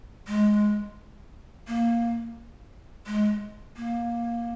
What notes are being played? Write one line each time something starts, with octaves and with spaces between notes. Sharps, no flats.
G#3
A#3
G#3
A#3